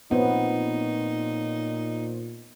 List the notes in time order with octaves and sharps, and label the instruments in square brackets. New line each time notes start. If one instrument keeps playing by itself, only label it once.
[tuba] A#2 [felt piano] F3 C4 C#5 [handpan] B3 [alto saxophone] D#4